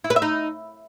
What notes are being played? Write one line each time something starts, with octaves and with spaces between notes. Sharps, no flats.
E4
B4
E5
D#4